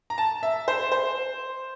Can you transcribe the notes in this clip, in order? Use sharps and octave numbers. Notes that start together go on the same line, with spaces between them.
A#5
A5
E5
C5
C5